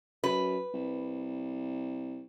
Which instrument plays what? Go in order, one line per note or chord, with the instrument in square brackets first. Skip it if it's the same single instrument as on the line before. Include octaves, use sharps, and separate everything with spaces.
[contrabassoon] F#2 [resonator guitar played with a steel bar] B4
[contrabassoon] C2